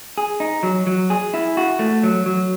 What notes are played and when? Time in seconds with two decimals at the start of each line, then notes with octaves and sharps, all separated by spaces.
0.18 G#4
0.40 D#4
0.63 F#3
0.87 F#3
1.10 G#4
1.34 E4
1.57 F#4
1.79 A3
2.03 F#3
2.26 F#3